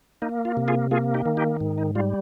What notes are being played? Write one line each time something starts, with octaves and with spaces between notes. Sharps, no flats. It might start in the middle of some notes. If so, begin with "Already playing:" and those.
A#3 D#4
F4
C3
F4 G#4
A#3 F4 G#4
D#4 G4
D#3
D#4 G4
G#2
D#4
G3 F4